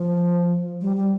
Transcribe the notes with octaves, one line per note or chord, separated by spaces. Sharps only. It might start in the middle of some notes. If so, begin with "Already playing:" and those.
Already playing: F3
G3
G3